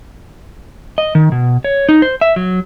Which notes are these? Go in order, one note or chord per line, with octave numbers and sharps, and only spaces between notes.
D#5
D#3
B2
C#5
D#4
C5
E5
F#3